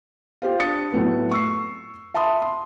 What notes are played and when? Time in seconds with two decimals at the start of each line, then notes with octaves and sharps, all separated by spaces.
0.42 F4 G4 C5 F5
0.59 D4 D#6 A6 C#7
0.92 A2 F#3 A3 B3
1.31 C#6 E6 C7
2.14 E5 A5 B5 C6 D#6
2.42 C6